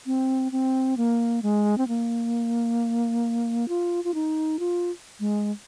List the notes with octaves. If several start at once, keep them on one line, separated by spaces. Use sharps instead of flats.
C4
C4
A#3
G#3
C4
A#3
F4
F4
D#4
F4
G#3